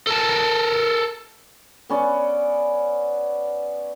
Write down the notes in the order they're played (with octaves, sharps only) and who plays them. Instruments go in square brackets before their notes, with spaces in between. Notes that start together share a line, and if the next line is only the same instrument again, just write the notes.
[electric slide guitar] A4 A#4 A5
[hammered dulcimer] B3 C#4 D5